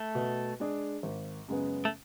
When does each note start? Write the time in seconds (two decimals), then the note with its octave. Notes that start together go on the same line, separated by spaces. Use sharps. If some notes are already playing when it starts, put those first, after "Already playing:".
Already playing: A3
0.15 B2
0.60 G#3 D4 G#4
1.03 G#1
1.48 F#2 C#3 G#3 B3
1.85 A3